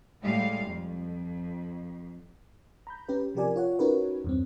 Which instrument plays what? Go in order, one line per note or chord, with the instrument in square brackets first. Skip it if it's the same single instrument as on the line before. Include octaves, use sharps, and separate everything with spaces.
[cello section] A2 G3 G#3 F5
F2
[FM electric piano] A#5 B5 G6
C#4 G4 B4
C3 F3 G4 A#4 D5 G#5
F4 C#5 F#5
C#4 D#4 F#4 A#4 B4 C#5
E2 G2 C4